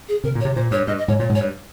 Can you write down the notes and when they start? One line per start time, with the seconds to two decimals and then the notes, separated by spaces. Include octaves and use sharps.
0.08 G#4
0.24 C3 A#4
0.35 A#2
0.41 C#5
0.45 C3
0.56 A#2 C5
0.71 G2 C#5
0.87 G2 D#5
0.98 D#5
1.08 G#2 C#5
1.19 A#2 C#5
1.29 G#2
1.35 C#5
1.40 G2